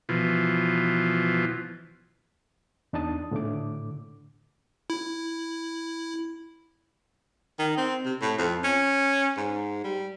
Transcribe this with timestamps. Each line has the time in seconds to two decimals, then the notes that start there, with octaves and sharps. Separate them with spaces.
0.09 B2 E3 F3
2.93 E2 D4 D#4 A5 D#6
3.31 A2 D3 A3 D6
4.90 E4
7.59 D#3
7.77 C4
8.05 C3
8.21 A2
8.38 F2
8.64 C#4
9.37 G#2
9.84 G3